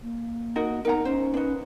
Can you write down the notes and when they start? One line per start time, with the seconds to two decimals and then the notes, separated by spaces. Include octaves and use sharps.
0.03 A#3
0.56 D#4 F#4 A#4
0.85 B3 D#4 A#4 F#5 A#5
1.05 C#4 C5
1.34 D4 D#4 B4